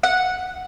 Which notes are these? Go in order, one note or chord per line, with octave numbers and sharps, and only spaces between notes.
F#5